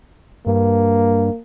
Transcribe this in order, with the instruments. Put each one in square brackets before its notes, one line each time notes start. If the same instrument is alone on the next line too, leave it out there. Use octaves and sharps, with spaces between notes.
[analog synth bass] G2 [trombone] A#3